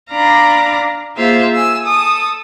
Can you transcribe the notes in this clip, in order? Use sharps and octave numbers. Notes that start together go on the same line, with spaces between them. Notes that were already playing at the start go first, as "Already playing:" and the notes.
D4 D5 F5 A#5 B5
A#3 F4 G#4 C5 E5 F5
G#5 E6
A4 D#6